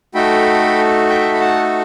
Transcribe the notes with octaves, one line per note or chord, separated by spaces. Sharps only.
A3 D#4 F#4 A4 G5 B5
E5 G5
B5
F#5 A5